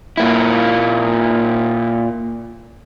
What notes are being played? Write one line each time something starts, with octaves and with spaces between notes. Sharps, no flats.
A#2 A#3 E4